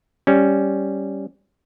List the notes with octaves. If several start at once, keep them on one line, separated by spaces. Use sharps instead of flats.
G3 C#4